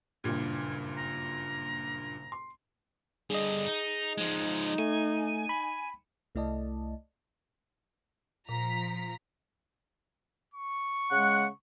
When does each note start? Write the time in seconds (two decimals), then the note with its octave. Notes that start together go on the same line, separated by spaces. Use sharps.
0.24 F#1 G2 A#2 G4 G#6
0.96 A#5
2.32 C6
3.30 G2 D3 G#4 D#5
3.66 D#4
4.18 F3 G#3 D#4
4.79 A3 G#5
5.49 B5
6.35 C2 A3 E4 D5 D#5 A5
8.49 A#2 F3 A#5 B6
10.54 C#6
11.12 C#3 G#3 F#5